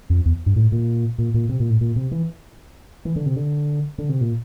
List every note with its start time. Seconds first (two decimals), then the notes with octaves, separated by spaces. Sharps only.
0.10 F2
0.25 E2
0.46 G2
0.56 A2
0.72 A#2
1.18 A#2
1.34 A#2
1.49 C3
1.60 A#2
1.70 A2
1.81 A#2
1.96 C3
2.11 E3
3.05 E3
3.16 D3
3.26 C3
3.36 D3
3.98 D3
4.09 C3
4.21 A#2